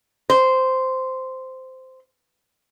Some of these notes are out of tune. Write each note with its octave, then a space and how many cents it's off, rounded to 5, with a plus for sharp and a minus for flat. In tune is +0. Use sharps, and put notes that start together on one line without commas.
C5 -10